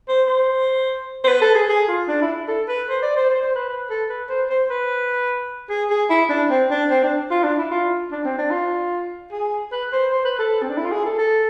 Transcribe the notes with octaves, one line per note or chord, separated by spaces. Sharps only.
C5
C5
C5
B4
A4
G#4
G#4
F4
D4
E4
A4
B4
C5
D5
C5
C5
C5
B4
B4
A4
B4
C5
C5
B4
G#4
G#4
E4
D4
C4
D4
C4
D4
F4
D4
E4
F4
D4
C4
D4
F4
G#4
B4
C5
C5
B4
A4
C4
D4
E4
F4
G#4
A4
A4